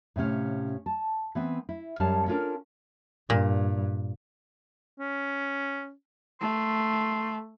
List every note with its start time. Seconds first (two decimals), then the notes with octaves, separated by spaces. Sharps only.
0.16 A2 C3 C#4 F5
0.86 A5
1.35 E3 B3 C4
1.69 E4
2.00 F#2 G3 C#4 F5 A5
2.27 C#4 D4 F4 A4 A#4
3.30 G2 A#2
4.99 C#4
6.41 A3 C6